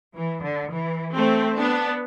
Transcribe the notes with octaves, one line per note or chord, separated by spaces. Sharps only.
E3
D3
E3
A3 C4
B3 D4